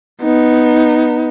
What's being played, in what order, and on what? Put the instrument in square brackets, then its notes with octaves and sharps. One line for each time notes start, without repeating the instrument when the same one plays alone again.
[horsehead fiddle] B3 D#4